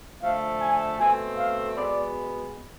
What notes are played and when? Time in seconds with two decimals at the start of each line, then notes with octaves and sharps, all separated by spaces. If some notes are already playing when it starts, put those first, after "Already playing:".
0.21 D3 F3 A3 F5
0.61 G#5
0.98 B2 A3 C4 G#5
1.37 F5
1.75 B2 G#3 B3 D5